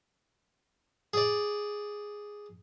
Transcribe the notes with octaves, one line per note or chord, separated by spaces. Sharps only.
G#4 D5